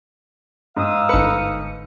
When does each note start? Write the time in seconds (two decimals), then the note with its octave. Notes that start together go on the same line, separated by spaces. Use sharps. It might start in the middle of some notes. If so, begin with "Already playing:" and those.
0.77 G#2 F5 D#6 E6
1.09 G1 D#4 A4 B4 C#7